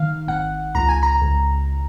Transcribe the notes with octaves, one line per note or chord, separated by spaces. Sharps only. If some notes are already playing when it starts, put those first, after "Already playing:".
Already playing: D#3 F5
G#1 F#5
C#2 A#5
G#5
A#5
C#2